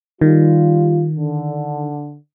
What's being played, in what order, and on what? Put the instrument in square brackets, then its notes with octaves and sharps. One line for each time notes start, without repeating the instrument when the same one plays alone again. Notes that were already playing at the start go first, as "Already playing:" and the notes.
[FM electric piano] D#3 [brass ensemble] G3 F4
[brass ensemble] D3